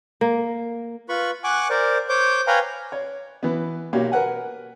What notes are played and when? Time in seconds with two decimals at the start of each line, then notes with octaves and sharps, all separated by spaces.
0.21 A#3
1.09 F4 B4 B5 C#6
1.44 F#5 G#5 C#6 D6 F#6
1.70 A#4 C5 D5
2.09 C5 C#5 D6 G6
2.47 B4 C#5 F5 G5 G#5 A#5
2.92 C#5
3.43 E3 B3
3.93 B1 A#3 F#4 G4 C#5
4.12 A#4 B4 F#5 G#5